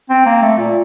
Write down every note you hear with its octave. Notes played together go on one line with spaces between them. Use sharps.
C4
A#3
A3
A#2